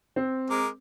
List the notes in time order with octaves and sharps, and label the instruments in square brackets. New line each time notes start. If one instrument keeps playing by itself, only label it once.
[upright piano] C4
[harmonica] G#3 A#4 D6